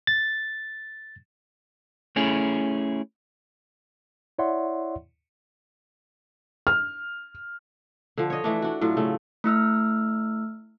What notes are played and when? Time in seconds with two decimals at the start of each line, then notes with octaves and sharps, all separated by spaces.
0.07 A6
2.16 A3 C#4 E4 G#4
4.38 E4 C#5 D5 E5 F#5 C6
6.67 F6
8.18 D3 F3
8.30 C#5 D#5
8.44 E3 A3 D4
8.62 D4 F#4
8.81 A2 F#3 F4
8.97 C#3 A3
9.44 A3 E4 E6 F6